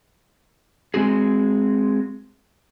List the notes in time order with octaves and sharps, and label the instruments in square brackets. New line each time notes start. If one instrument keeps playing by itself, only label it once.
[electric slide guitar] G#3 C4 F#4 G#4